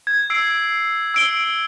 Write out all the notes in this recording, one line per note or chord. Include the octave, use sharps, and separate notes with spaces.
G#6
E6 C7 D7
E6 D7 G7